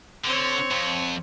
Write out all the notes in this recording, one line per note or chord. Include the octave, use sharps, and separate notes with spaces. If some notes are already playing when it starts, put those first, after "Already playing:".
D3 C4 C#5
F2